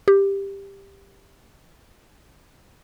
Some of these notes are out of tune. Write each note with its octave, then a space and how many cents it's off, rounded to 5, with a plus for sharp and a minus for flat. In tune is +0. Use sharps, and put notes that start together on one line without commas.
G4 +10